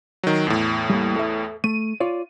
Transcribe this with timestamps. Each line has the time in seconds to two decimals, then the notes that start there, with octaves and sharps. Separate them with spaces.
0.23 D#3 F#3
0.47 E2 A2
0.90 G3 A#3
1.16 A4 E5
1.64 A3 D#7
2.00 F4 C#5 D5